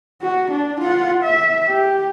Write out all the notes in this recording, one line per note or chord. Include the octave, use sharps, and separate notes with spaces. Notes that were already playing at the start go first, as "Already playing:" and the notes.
F#4
D4
F4 F#5
E5
G4